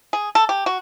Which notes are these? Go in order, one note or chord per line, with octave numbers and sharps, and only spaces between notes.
G#4
A4
G4
F#4